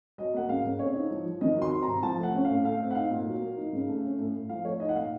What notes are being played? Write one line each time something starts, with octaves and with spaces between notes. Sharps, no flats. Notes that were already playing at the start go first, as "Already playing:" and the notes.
F#3 D#5
A#3 F#5
C#3 F5
C#3
C4 C#5
D#4
F3
F3
D#3 D#5
F#3
C6
C4
C3 A#5
F3 A5
A3 F#5
C#4
A2 F5
A3 F5
C4
F#5
D#4 F5
A#2
F#3
A#3
D#4
C#3
A3
C#4
A2
A2
F3 F5
A3 C#5
D#4 D#5
F#5
A#2 F5